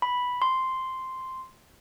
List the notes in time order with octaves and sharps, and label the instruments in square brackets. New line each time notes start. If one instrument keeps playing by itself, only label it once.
[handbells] B5
C6